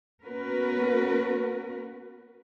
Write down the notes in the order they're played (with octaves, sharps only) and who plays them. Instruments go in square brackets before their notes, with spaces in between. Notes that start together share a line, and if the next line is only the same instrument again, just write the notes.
[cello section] A#3 B3 C#4 F#4 A#4 B4